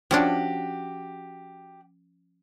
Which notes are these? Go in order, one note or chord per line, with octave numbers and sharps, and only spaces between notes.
F3 C#4 D4 F#4 G4